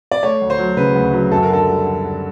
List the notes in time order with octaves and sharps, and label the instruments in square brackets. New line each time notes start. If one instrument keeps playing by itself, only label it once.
[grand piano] D5
A3 C#5
D2
C5
F#3
C#3 B4
D2
F#3
F#2 A4
A#4
D3 A4
G3
D3
D3